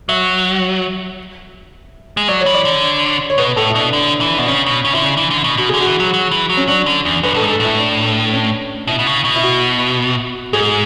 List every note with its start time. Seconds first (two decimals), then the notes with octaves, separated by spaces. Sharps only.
0.09 F#3 E5
2.17 G#3
2.28 F#3 D5
2.41 C#5
2.46 E3
2.54 D5
2.65 D3
3.30 C#5
3.38 B2 B4
3.56 A2 A4
3.70 E4
3.75 B2 D4
3.93 D3 D4
4.21 E3
4.29 E4
4.38 B2 D4
4.48 C#3 C#4
4.66 B2
4.85 C#3
4.93 D3 E4
5.03 C#3 D4
5.17 E3
5.31 D3
5.44 B2
5.58 B2 F#4
5.69 D3 G#4
5.81 E3 F#4
6.00 F#3
6.14 F#3
6.31 E3
6.50 F#3
6.57 C#4
6.68 F#3 D4
6.86 D3
7.05 E2
7.23 F#2 B4
7.34 A2 A4
7.42 G#2
7.51 A4
7.60 A2 E4
7.78 D4
8.33 C#4
8.87 B2 E4
8.99 B2
9.07 C#3
9.25 B2
9.36 E4
9.43 F#4
10.53 G#2 G#4